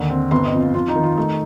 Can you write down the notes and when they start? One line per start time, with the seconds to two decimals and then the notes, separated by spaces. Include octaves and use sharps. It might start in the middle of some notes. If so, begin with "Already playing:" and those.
Already playing: D#2 D3
0.10 C4
0.31 G1 C6
0.45 D#5
0.53 F2
0.60 F4
0.74 F2 F4
0.88 D#4
0.96 D#3
1.03 F4
1.17 A3 D#4